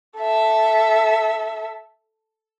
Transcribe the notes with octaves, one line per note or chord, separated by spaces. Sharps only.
A4 E5